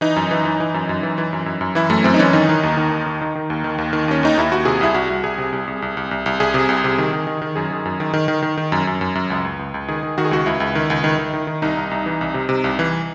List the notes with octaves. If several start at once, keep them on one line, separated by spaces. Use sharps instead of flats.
E3 D#4
F#2
E3
E3
E3
F#2
F#2
E3
E3
F#2
F#2
F#2
E3 E4
F#2 A3
F#2 C4
D#4
E3 C#4
D#3 D#4
D#3
D#2
D#3
D#2
D#3
D#3
D#3
D#2
D#3
D#2
D#3
D#2 C#4
D#2 D#4
D#2 E4
D#2 F#4
C3 G#4
C2 E4
C2 F#4
C2
C2 G#4
C3
C2
C2
C2
C2
C2
C2
C2 G#4
C3
C2
C3
D#3
D#3
D#3
D#3
F#2 G#4
D#3
F#2
D#3
D#3
D#3
D#3
D#3
F#2
F#2
F#2
F#2
C#2
C#2
C#2
C#2
D#3 G#4
D#3
D#3 F#4
G#4
C#2 F#4
C#2 E4
C#2
D#3
C#2
D#3
D#3
D#3
D#3
C2 D#4
C2
C2
E3
C2
C3
C3
C2
E3